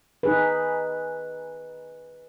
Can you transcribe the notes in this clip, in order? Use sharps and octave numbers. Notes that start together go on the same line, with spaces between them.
D#4 G#4 B4